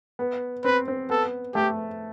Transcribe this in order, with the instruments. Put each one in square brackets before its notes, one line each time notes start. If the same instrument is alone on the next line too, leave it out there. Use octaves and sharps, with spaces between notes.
[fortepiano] B3
[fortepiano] C4 [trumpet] B4
[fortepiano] C4
[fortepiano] B3 [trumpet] A4
[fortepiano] A3 [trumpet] G4